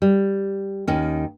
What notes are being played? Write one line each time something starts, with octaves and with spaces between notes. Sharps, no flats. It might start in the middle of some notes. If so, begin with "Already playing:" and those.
G3
D#2 D#3 C#4